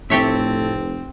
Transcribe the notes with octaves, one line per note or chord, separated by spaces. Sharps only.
F1 A2 C4 G4 A4 C#5 E5 A6